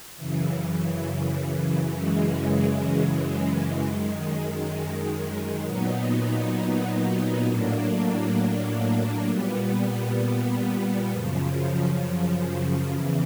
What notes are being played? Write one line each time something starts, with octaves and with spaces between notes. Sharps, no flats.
F#2 C#3 E3
F#2 C#3 E3 G#3
F#2 D#3 G#3
A#2 F#3 B3 D#4
A2 F#3 A#3 D4
A#2 G3 B3
F#2 C#3 F3
E2 C#3 E3